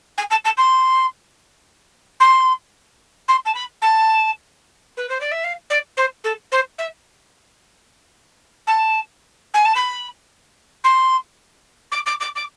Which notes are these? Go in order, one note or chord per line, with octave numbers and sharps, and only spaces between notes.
G#5
A5
A5
C6
C6
C6
A5
B5
A5
B4
C5
D5
E5
F5
D5
C5
A4
C5
E5
A5
G#5
A5
B5
C6
D6
D6
D6
D6